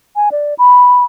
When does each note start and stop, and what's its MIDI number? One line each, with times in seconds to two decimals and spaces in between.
0.16 0.29 80
0.32 0.54 74
0.58 1.04 83